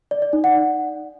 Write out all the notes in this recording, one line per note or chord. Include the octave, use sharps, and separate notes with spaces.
D5
D5
D#4
F#5